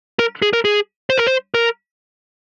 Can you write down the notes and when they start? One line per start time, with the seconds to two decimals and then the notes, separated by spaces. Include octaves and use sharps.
0.19 A#4
0.42 G#4
0.53 A#4
0.65 G#4
1.10 C5
1.18 A#4
1.27 C5
1.54 A#4